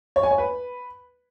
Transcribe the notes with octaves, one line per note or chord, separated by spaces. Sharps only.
C#5
G#5
C#5
B4